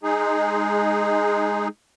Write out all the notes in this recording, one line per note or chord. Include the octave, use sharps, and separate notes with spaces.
G#3 D#4 G#4